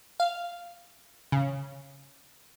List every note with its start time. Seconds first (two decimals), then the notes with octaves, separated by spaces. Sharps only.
0.20 F5
1.32 C#3